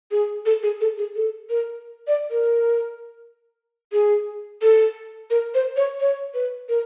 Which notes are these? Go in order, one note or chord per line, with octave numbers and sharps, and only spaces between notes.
G#4
A4
G#4
A4
G#4
A4
A#4
D5
A#4
G#4
A4
A#4
C5
C#5
C#5
B4
A#4